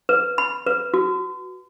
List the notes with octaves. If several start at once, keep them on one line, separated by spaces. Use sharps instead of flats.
B4
B5
B4
F#4